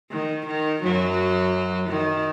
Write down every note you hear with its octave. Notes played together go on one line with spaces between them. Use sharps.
D#3
D#3
F#2 F#3
D#3